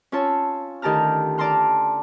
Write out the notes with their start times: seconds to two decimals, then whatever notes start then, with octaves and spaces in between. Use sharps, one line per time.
0.12 C#4 F4 C#5 A5 E6
0.82 D2 D#3 G4 A5 A#5 F6
1.38 D5 A5 A#5 C6 F6